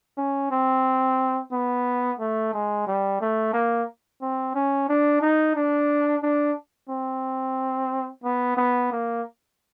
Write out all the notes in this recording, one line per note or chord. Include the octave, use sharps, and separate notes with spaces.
C#4
C4
B3
A3
G#3
G3
A3
A#3
C4
C#4
D4
D#4
D4
D4
C4
B3
B3
A#3